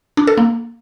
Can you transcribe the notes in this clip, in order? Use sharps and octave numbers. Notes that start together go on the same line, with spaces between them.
D4
A4
A#3